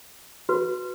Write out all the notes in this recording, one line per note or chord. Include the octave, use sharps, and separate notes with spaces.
F#4 B4